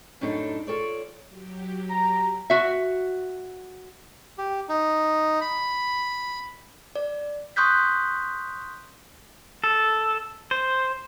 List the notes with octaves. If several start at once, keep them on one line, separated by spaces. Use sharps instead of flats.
F#2 A2 F#3 D4 D#4 A4
F4 A4 C#5 D5
F#3 G4
A#5
F#4 E5
G4
D#4
B5
D5
C6 C#6 D#6 F#6 G6 B6
A4
C5